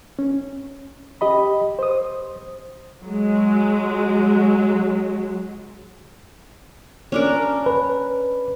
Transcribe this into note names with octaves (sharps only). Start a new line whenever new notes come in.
C#4
G4 D#5 B5
C5 D#6
F#3 G#3
C#4 D4 A#4
B4